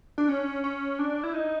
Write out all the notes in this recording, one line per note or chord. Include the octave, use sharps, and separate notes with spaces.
D4
C#4
C#4
D4
E4
D#4